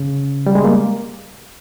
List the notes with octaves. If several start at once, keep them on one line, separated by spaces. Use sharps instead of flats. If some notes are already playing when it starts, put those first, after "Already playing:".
Already playing: C#3
G3
G#3
A#3